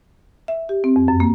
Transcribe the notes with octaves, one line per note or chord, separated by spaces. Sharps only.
E5
G4
C4
F2
F#2
A#3